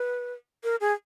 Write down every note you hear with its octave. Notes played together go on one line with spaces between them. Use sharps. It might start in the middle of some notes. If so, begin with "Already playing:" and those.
Already playing: B4
A#4
G#4